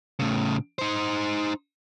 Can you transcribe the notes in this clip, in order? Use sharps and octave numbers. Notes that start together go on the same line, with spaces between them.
A2 C#3
D#4 C5